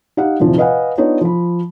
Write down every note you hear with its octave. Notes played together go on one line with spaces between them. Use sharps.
D#4 G4 F5 F#5
A#1 E2 C3 D#3 F3
B4 D#5 F5 F#5 G#5
B3 D4 D#4 F4 C#5
F3 B5